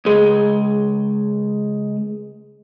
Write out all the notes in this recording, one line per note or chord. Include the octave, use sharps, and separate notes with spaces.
C#2 G#3